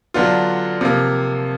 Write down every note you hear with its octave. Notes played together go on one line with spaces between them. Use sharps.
D3 F#3 B3 D4 F4
C3 F3 A#3